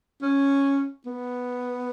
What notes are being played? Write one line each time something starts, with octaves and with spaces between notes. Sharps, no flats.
C#4
B3